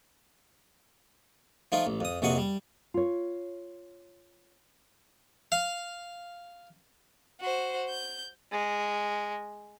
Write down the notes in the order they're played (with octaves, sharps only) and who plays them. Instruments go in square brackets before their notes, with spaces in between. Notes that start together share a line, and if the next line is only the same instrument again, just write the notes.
[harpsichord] F3 A3 D#4 F4
A1
F2 D#6
A#1 F2 C3 F#4 D#5 F#5
G3
[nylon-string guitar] F4 C#5
[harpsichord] F5
[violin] F#4 C5
G6
[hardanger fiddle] G#3